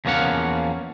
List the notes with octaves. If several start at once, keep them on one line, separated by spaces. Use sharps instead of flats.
E2 F3 A#3 C#4 F5 F#5